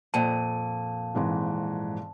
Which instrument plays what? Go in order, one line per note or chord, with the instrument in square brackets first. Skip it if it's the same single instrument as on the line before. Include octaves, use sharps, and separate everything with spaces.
[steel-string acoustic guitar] F2 A#2 [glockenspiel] A5
[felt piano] G#1 G#2 E3